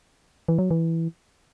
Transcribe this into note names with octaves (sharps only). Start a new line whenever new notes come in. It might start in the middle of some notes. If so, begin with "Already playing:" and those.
E3
F#3
E3